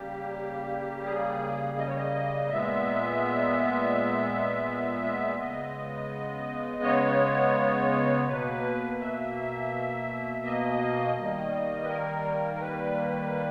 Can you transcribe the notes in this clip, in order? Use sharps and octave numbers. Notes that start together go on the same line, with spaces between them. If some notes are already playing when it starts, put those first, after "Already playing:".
Already playing: C#3 G3 A#3 G4
G#4
D#5
C#5
D#5
A#2 G#3 B3 E5
C#3 G#3 B3 D#5
C#5
B2 A#3 B4
E5
D#5
D#3 G3 A#3
B4
A#4
A#4
B4